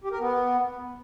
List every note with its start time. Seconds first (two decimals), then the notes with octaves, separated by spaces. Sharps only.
0.04 G4
0.12 A#4
0.20 B3